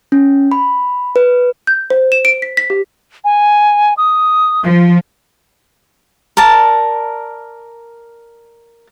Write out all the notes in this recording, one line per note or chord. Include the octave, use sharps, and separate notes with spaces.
C#4
B5
B4
G6
C5
E7
D7
B6
B6
G4
G#5
D#6
F3
A#4 D5 A5